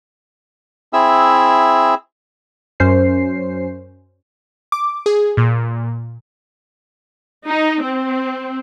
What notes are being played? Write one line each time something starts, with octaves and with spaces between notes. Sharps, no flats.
C4 E4 G#4 E5 E6
F#2 C#4 C5 C7
D6
G#4
A#2
D#4
C4